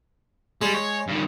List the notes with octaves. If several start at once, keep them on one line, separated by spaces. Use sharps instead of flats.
G3 G#3
C#5
G2 D#3